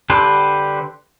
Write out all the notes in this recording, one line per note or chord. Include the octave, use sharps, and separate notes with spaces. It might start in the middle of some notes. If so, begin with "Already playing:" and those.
D3 D4 G4 B4 C5